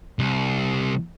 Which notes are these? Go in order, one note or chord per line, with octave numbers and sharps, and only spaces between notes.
C2